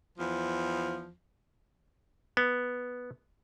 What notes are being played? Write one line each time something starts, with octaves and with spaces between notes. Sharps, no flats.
E2 F3
B3